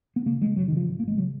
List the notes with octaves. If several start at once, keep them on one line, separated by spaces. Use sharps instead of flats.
B3
C#3 A#3
C#3 G#3
F1 F#3
D#3
C#3 F3
G#1
A#3
G#1 G#3
C#3 F#3